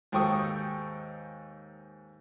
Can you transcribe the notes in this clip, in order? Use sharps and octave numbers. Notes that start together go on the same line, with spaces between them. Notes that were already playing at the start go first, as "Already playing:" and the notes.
D#2 G#2 A4 G5 C#6 D#6